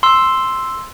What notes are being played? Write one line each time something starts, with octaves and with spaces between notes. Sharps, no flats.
C6 E6